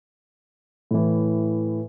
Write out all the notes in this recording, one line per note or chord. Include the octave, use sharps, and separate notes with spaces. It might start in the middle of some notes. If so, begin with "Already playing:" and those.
A2 E3